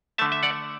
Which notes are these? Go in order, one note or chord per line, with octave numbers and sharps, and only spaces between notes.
D3 A3 E5 A5
E5
D5 F#5